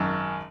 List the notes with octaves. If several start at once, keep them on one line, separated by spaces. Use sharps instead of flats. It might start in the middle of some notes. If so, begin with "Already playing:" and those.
Already playing: G#1 F#2